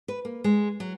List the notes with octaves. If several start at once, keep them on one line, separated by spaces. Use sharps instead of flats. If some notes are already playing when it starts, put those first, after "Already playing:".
B4
A#3
G#3
F#3